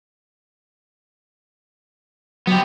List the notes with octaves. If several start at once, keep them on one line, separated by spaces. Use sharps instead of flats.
F#3 B3 G4